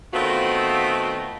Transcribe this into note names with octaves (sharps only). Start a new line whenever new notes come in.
D#3 A3 B3 C4 F4 F#4